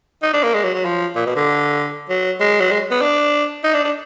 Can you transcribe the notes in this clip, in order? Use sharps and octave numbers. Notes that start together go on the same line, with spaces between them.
D#4
D4
A#3
G#3
F#3
F#3
F3
A#2
B2
D3
F#3
G#3
F#3
G#3
B3
D4
D#4
D4
D4